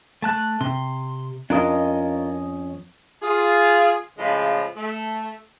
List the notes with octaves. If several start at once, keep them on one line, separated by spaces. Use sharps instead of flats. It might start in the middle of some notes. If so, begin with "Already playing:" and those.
A3 A5 F#6
C3 C6
F2 C#4 D4 F4 A#4 D#5
F4 G#4
A2 C#3 F3 G#3
A3